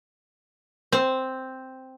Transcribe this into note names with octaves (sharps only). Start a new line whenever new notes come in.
C4